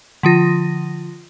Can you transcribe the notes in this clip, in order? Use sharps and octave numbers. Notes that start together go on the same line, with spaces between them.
D3 F3 F4 A#6